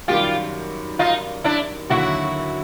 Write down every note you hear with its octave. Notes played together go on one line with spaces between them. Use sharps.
F#2 D#3 G3 F4 G4
D#4 F4
D4 E4
D#2 D3 F#3 E4 F#4